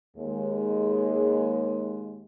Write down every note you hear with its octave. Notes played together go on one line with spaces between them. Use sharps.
D#2 G#3